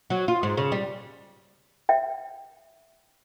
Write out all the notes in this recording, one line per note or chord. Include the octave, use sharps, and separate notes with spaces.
F#3
F4
G#2
C#3
G3
E5 G5